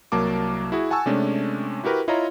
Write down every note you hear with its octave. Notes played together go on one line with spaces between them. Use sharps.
C2 F#3 A#3 A5 D6
E4 F#4 G#4
F#5 G#5 A5 C#6 E6
C3 G#3 A3 C#4 D4
E4 F#4 G4 A#4 B4
E4 F4 C#5 D#5 F5 A#5